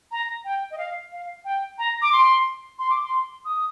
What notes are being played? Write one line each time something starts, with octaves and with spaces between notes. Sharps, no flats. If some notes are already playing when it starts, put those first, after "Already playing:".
A#5
G5
D#5
F5
F5
G5
A#5
D6
C6
C6
D6
C6
D#6